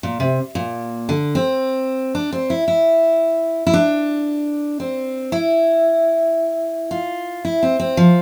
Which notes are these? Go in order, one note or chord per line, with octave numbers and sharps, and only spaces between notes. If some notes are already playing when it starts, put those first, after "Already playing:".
A#2
C3
A#2
D3
C4
D4
C4
E4
E4
E4
D4
C4
E4
F4
E4
C4
C4
F3